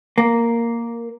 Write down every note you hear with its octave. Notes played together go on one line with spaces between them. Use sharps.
A#3